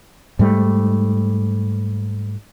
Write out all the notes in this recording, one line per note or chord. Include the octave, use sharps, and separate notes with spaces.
G#2 G3 A3